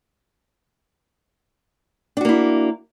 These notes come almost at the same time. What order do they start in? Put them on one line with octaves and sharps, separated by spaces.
D4 F#4 A#3 E4